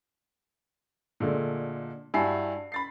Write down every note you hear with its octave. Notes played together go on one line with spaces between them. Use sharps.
A#2 D3 G#3 A3
G2 E4 F#4 G#5 A5 C7
B5 A6 C7